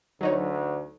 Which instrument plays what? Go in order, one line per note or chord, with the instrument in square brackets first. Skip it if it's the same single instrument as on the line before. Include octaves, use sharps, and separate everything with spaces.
[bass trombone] D2 [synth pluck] F#3 D#4 C#5